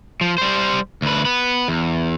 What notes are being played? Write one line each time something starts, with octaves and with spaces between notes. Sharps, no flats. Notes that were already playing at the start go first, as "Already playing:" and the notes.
F3
G3 C5
D2 B4
B3 B4
E2